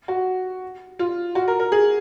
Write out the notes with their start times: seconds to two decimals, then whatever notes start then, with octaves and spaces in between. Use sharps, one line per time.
0.08 F#4
0.99 F4
1.35 F#4
1.48 A#4
1.59 A#4
1.72 G#4